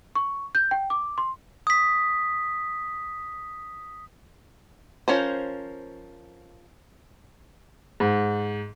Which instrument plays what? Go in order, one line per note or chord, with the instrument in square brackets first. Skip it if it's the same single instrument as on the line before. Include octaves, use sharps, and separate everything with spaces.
[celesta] C#6
G6
G5
D6
C6
[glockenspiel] D#6 B6
[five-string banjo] F3 F#3 C#4 A#4 C5
[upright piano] G#2